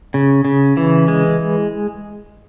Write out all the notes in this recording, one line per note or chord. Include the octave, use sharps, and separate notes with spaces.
C#3
C#3
E3
G#3